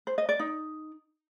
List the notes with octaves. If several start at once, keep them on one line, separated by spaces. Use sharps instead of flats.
C5
D#5
D5
D#4